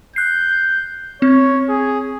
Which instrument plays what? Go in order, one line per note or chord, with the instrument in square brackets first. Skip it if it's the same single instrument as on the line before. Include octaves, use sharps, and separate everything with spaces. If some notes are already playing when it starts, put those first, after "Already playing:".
[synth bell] F#6 C7 [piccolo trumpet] G6
[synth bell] C4 [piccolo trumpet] C#5
[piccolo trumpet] G#4